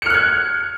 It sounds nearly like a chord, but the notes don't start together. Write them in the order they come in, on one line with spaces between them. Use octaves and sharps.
C#7 F6 F#6 G#6